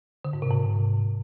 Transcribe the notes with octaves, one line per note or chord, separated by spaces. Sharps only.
D3
G#2
C3
G#2